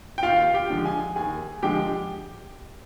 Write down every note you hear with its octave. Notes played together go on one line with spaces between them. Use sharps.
G5
D#2 F4 F5
G4 G5
D3 F3 G#3
G#4 G#5
D#2 G#4 G#5
D3 F3 G#3 G4 G5